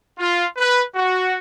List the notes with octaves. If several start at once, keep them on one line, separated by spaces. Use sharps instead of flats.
F4
B4
F#4